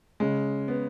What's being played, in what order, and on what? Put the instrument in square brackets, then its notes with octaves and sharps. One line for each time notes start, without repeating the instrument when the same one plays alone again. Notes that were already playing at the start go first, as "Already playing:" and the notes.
[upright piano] C#3 [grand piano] G#3
[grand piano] B3